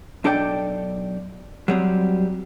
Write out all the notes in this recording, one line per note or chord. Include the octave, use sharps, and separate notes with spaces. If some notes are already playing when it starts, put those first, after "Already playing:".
B1 D4 A4 D5 G5
F#3 G3 C4